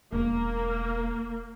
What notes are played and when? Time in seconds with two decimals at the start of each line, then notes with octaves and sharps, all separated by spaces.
0.12 E1 A#3